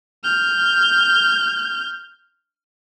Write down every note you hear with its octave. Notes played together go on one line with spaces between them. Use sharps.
F6 G6